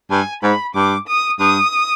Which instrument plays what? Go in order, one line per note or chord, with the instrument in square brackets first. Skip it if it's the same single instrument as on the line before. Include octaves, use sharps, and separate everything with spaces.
[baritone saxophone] G2 [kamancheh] G#5
[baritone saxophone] G#2 [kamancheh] B5
[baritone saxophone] G2 [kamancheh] D6
[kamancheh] D#6
[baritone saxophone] G2 [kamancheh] D#6